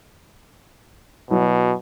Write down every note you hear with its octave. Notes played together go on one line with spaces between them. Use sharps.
B2 F#3 E4